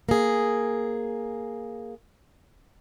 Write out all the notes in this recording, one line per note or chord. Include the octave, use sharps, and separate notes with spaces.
A#3 G#4